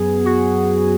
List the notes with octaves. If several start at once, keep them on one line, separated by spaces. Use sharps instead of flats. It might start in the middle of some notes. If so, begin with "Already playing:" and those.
Already playing: F#2 F#3 B3 G#4
F#4